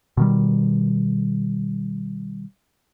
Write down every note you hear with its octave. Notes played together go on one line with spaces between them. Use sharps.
B2 D#3 G3